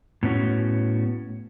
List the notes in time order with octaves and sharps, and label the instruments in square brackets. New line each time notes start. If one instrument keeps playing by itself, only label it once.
[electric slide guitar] A2 B3 C#4 F#4